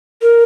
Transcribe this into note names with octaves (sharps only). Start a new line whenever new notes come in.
A#4